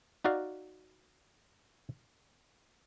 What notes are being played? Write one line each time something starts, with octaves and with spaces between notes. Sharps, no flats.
D#4 F#4 D5 F5